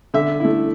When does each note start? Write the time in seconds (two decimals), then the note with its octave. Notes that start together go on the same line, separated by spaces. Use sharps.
0.14 D3 E5
0.40 A3 E4